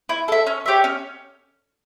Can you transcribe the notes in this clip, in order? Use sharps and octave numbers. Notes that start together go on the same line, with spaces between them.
E4
A4 E5
C#4
G4 C#5 E5
C#4